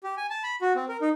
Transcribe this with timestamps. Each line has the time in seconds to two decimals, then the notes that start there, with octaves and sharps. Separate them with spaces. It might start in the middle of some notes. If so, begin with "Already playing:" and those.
0.04 G4
0.17 G#5
0.30 A5
0.44 B5
0.61 F#4
0.76 C4
0.89 A#4
1.01 D#4